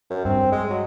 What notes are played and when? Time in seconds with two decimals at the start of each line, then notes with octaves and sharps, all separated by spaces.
0.10 F#2
0.25 G2 C4
0.52 G#3
0.70 F#3